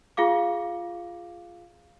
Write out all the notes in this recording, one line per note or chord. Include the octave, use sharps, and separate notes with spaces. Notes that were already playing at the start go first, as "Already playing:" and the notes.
F4 G#4 F5 D6